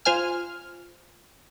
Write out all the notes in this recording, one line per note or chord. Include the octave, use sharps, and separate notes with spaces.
F4 C5 G#5 F6